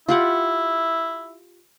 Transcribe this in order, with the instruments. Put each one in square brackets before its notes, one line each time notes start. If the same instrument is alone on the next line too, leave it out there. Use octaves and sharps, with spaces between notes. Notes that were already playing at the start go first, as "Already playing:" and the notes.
[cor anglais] E4 [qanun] F4 G4 F#5